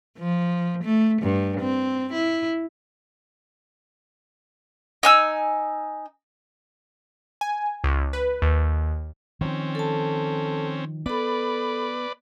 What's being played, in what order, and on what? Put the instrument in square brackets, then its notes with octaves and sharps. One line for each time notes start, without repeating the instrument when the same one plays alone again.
[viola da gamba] F3
A3
G2
C4
E4
[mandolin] D#4 G#5 E6
[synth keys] G#5
C#2
B4
D#2
[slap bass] D#3 F3 [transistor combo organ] C4 C#4
[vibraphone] A4 A5
[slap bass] B3 [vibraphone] A4 B5 [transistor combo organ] B4 D5